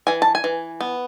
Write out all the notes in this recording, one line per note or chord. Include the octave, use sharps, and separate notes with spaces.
E3 G#5
A5
G#5
E3
B3